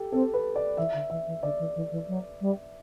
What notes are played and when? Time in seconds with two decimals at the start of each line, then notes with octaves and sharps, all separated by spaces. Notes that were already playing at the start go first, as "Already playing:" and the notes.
Already playing: G4 A4
0.12 C4 A4
0.34 B4
0.56 D5
0.77 E3 E5
0.93 D3
1.10 E3 E5
1.27 E3
1.42 D3 D5
1.59 E3
1.75 E3
1.91 E3
2.08 F#3
2.41 G3